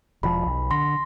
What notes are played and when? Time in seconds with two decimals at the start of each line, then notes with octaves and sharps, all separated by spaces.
0.23 E1 F3 B5
0.46 B1
0.71 D3 C6 A#6